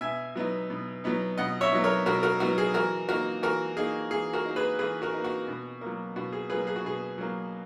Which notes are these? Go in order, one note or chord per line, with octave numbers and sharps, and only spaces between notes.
B2 E5 G#5
F#3 B3 D#4
B2
F#3 B3 D#4
B2 D#5 F#5
C#5 E5
F#3 B3 D#4
A#4 C#5
B2 F#4 A#4
F#4 A#4
F#3 B3 D#4 F#4
G#4
E3 F#4 A#4
A#3 D#4 F#4 A#4
E3 F#4 A#4
A#3 D#4 G#4
E3 G#4
F#4 A#4
A#3 D#4
G#4 B4
E3 G#4 B4
F#4 A#4
A#3 D#4
F#4
B2
A#3
F#3
B2 F#4
G#4
F#3 A#3 G#4 B4
G#4
F#4
B2 G#4
F#3 A#3